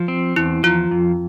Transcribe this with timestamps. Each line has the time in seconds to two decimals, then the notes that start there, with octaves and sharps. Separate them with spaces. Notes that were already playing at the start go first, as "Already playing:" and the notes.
Already playing: F3
0.08 C4
0.36 E2 E4
0.63 F3 F4
0.91 F2